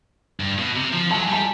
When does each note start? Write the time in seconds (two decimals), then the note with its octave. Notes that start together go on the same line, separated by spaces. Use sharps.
0.40 G2
0.58 B2
0.75 C3
0.93 F3
1.10 F#3 A5
1.21 G#5
1.28 G3 A5